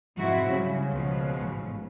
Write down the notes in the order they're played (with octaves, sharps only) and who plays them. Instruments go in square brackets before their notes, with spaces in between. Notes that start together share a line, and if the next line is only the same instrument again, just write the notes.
[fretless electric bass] F1 F3 F#3 [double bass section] G#2 [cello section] C4 E4 F#4
[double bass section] C#3 [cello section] F#3 [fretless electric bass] G3
[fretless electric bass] C#2 [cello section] B2 F3
[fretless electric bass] A1 G#2